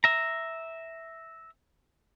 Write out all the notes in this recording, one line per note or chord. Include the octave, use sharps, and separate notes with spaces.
E5 A#5